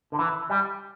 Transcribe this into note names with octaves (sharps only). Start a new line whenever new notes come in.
D3
E3
G3